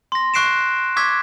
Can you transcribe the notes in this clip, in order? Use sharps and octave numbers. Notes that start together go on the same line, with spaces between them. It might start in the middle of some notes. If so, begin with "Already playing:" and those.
C6 A#6
C#6 F#6 C7 D7 E7
C#6 D6 E6 G#6 B6